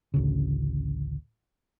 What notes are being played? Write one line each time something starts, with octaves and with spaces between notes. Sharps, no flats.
A1 D2 C#3